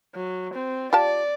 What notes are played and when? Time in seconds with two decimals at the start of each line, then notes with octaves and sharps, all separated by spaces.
0.15 F#3
0.54 C4
0.93 F4 G4 D5 A5